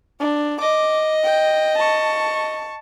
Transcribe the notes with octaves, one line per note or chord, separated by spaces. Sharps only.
D4
D#5 D6
G5
A5 C#6